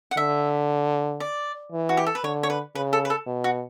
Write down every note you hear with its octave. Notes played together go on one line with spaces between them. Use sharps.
F#5
D3 E5
D5
E3
F#4
G4
A4
B4
D3 C#5
C#5
B4
C#3 B4
A4
B4
A4
B2
F#4